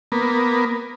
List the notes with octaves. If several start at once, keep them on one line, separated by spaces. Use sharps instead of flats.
A#3 B3